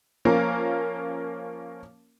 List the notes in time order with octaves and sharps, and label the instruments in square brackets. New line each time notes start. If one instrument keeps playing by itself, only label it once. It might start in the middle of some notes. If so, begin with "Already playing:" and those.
[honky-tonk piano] F3 A#3 C#4 F4 A#4